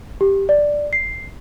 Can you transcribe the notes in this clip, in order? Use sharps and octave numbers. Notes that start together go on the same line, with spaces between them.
G4
D5
C7